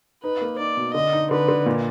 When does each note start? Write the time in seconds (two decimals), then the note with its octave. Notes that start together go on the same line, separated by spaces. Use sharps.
0.23 D#4 B4
0.41 A#3
0.59 D#4 D5
0.77 B2
0.94 D3 D#5
1.13 D#4
1.31 D3 B4
1.48 D3
1.66 A#2